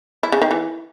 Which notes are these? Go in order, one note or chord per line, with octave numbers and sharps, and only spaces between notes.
E4
C#3
D#3
E3